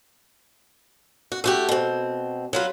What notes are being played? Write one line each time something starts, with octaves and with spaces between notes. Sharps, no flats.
F#4
A3 F#4 G4
B2 C4
F#3 F4 B4